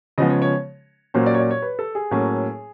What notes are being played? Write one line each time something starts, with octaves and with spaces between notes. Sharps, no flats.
C#3 F3 G#3 B3 D#5
C#5
C#5
A#2 F#3 A#3 C#4 C5
D5
C#5
D5
C#5
B4
A4
G#4
A2 F#3 A#3 C#4